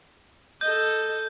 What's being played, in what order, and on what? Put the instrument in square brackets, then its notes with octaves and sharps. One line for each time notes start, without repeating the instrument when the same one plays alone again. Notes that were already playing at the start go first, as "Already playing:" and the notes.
[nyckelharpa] A4 D#5 [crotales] G6